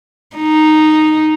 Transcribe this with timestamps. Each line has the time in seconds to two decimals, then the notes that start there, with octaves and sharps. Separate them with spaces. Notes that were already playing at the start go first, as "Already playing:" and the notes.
0.37 D#4